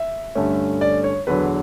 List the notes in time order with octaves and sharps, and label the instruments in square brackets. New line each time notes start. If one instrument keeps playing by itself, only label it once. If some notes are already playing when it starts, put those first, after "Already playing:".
Already playing: [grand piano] E5
G2 D3 A3 C#4
D5
C#5
E2 D3 F#3 B4